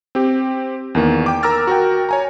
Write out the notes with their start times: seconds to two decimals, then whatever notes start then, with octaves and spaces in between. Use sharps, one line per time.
0.15 C4 G4
0.95 E2 D#3 A#3
1.26 G5 D6
1.43 A#4 A#5 D6 E6 F6 A6
1.67 F#4 A#4 G5
2.09 C#5 G#5 A#5